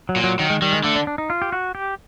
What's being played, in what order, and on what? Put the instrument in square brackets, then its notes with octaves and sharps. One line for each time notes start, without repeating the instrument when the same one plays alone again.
[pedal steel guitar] F#3
[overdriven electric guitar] A#2
[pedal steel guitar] F#3
[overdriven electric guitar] D#3 [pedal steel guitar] F#3
[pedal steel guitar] G#3
[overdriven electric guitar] D#3 [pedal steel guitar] G3
[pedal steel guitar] G#3
[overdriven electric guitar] D3 [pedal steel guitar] A3
[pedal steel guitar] D4
D4
D#4
F4
G4
F#4
G4